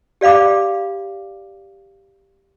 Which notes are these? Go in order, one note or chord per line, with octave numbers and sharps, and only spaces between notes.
G4 D5 F5 B5 D6